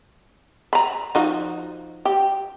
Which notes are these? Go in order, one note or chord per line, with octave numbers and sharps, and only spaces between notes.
A#5 B5
F3 D#4 F#4
G4